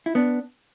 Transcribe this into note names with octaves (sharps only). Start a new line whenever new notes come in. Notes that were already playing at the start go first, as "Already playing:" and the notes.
E4
B3 D4